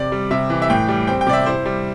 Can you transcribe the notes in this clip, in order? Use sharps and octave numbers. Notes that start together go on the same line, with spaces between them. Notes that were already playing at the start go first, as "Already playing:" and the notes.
Already playing: C3 D5
G3
C3 E5
E3
E5
A2 G5
G3
C4 G5
G5
C3 D5
E5
E4 C5
G3